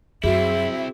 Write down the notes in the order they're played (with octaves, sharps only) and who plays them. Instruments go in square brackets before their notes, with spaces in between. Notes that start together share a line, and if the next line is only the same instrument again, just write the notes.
[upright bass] F#2 [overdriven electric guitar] C4 E4 [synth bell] F#4 G#4 [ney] E5